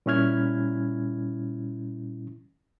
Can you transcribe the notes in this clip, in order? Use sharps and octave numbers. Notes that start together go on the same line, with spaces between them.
A#2 G3 C#4 E4 F6 G#6